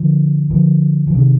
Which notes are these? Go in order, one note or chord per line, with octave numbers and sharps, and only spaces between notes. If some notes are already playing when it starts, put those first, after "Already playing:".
Already playing: D3 F3
D3 F3
F3
C3 D#3